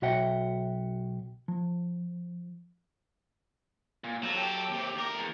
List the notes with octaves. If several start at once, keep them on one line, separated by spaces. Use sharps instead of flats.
B1 F#4 C#5 E5 F#5 G5
F3
A#2
F3 F#3 A4
F#3 G4 A4
D#2 C3
D2 A#4
E2